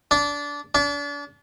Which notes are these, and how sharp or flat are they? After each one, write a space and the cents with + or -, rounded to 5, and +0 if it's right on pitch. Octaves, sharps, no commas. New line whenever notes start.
D4 -20
D4 -35